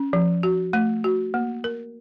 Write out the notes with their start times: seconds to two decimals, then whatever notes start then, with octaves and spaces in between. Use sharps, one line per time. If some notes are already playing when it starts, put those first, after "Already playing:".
Already playing: C#4
0.13 F3
0.43 F#4
0.73 A3
1.04 F#4
1.34 A#3
1.64 A#4